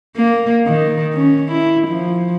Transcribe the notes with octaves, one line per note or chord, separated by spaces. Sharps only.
A#3
D#3
C#4
E4
F3